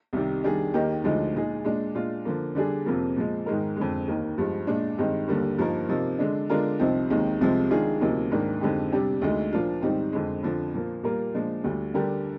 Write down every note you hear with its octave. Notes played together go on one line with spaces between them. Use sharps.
C2 C3 D#3 G3
D#3 G3 D4 G#4
D#2 D#3 A#3 D#4 G4
D2 D3 F3 G#3 D#4
A#2 G#3 D#4 G#4
A#2 G#3 D4
A#2 G#3 D4 F4
D3 F3 A#3
D3 G3 D4 G#4
F2 C3 F3 A#3
A#2 F3 G#3
G#2 D#3 G#3 D#4 A#4
F2 D3 G#3
D#2 D#3 A#3 D#4
G2 F3 G#3
A#2 G#3 D4
G2 D#3 G#3 C4 D#4
D#2 D3 G3 A#3
G2 F3 A#3 D#4 A#4
C3 F3 A#3 D#4
D3 G#3 D4
D3 G#3 D4 F4 A#4
C2 C3 F3 C4 D#4
D#2 D#3 G#3 C4
C2 C3 F3 G#3 C4
D#3 G#3 D4 F4 G#4
D2 C3 F3 A#3 D#4
G#2 D#3 A#3 D4
F2 D3 G#3 D#4 G4
C3 G3 D4 G4
D2 D3 G#3 D#4
A#2 F3 A#3 D4 F4
G#2 D#3 G3 C4 D#4
F2 D3 G#3
F2 D3 F3
A#2 F3 A#3
A#2 G3 A#3 F4 A#4
A#2 F3 G#3 D4
D2 D3 G3
D3 G3 D4 G4 A#4